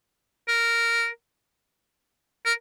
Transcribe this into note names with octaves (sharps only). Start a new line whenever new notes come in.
A#4
A#4